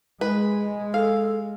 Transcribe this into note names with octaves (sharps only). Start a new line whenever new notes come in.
G#3 B4
A4 F5